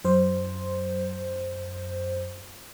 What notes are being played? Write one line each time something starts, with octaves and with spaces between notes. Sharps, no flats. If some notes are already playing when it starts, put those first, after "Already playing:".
F#2 C5